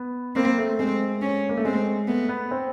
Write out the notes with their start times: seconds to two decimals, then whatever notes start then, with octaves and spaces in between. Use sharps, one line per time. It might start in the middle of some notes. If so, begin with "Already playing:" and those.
Already playing: B3
0.36 A#3 C4
0.58 A3
0.79 G#3 C4
1.22 C#4
1.49 A#3
1.57 A3
1.65 G#3 C4
2.08 A3 B3
2.29 B3
2.51 C4